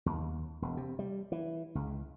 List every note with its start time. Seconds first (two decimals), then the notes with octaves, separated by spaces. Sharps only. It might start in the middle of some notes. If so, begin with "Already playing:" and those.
0.06 D#2
0.62 E1
0.77 C3
0.99 G3
1.32 E3
1.75 C#2